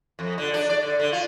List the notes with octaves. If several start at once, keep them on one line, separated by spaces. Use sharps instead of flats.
F2
D3
D4
D5
D3
D3
F4